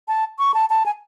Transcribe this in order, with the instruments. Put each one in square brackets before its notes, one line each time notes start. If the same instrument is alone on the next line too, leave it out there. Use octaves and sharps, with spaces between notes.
[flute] A5
C#6
A5
A5
G#5